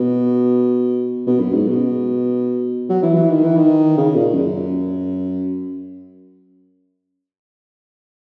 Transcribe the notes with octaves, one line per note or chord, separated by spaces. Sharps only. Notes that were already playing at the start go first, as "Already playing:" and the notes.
Already playing: B2
B2
F#2
G#2
B2
F#3
E3
E3
D#3
E3
D#3
C#3
A#2
F#2